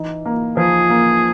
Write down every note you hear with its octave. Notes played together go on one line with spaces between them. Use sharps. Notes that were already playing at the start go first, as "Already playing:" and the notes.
Already playing: E3 D#4
A#3
F3 G#4
A#3